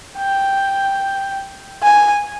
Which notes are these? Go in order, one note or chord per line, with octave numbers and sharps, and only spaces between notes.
G5
G#5